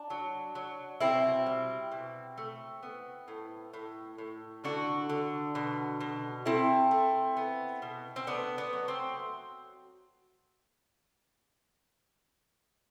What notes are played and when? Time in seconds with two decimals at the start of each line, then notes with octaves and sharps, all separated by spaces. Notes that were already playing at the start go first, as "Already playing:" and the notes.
Already playing: D4
0.10 F#3
0.55 F#3
1.00 B2 C4 E4
1.46 G3
1.92 B2
2.38 A3
2.83 B3
3.28 A2
3.74 A2
4.18 A2
4.64 D3 D4 F#4
5.10 D3
5.55 B2
6.00 B2
6.45 A3 C4 E4
6.91 A3
7.37 B3
7.82 B2
8.16 C4
8.27 A3 B3 D4
8.58 B3
8.73 F#3
8.88 C4